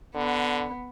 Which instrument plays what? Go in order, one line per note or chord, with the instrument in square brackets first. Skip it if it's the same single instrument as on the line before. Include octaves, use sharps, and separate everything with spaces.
[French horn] D3 [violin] B3